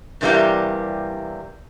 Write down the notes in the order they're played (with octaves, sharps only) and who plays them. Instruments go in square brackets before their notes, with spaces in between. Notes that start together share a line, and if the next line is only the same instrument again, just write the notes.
[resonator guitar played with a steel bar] G2 C3 E3 G3 A#3 G4